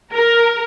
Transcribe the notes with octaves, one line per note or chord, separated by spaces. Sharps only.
A#4